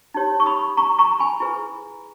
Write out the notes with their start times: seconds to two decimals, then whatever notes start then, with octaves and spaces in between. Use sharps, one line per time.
0.14 D#4 G4 C#5
0.40 C#6
0.46 B5 D#6
0.77 A#5 C#6
0.98 A#5 C#6
1.19 G#5 B5
1.40 E4 G#4 B4